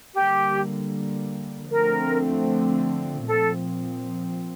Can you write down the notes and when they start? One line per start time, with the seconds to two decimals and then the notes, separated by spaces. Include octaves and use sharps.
0.14 D3 G3 A#3 G4
1.70 D3 F3 A3 C4 A#4
3.27 A#2 F3 C4 A4